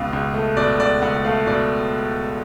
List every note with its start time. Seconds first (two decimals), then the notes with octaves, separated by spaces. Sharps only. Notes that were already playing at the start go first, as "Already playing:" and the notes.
Already playing: C#2 B2 F5
0.13 C#2
0.34 A3
0.57 B2 D5
0.79 C#2 D5
1.02 C#2 F#5
1.25 A3 F5
1.47 B2 D5